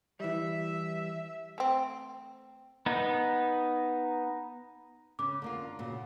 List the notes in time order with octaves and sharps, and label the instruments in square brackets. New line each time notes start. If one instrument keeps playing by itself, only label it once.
[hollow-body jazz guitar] E3 G3 [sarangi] E5
[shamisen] A3 C4
[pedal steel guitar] B3 D#4
[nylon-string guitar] C#3 C#4 [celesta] D6
[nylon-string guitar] D3 A#3 F4
A#2 C#3 F#4